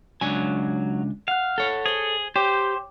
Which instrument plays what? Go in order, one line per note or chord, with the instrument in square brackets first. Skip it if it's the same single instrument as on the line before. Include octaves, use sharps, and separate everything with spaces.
[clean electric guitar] C#2 D4 G#5 [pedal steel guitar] F#3
[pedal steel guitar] F5 [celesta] F#5 F#6
[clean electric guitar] A4 C#5
[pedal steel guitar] G#4 [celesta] C5 G7
[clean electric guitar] G4 [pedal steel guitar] C5 [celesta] C#5 G5 D6